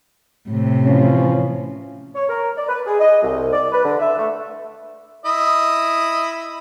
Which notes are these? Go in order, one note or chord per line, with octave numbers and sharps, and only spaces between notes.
A2 C3
E3 F3 C#4
C#5
A#4
D5
B4
G#4
D#5
C2
D5
B4
D3
E5
A3
E4 D#5